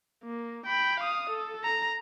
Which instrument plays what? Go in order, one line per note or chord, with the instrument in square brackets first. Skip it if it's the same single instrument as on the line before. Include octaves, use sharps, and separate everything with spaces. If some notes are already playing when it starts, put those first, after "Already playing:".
[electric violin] A#3
G5 B5
F5 D#6
A4
A#5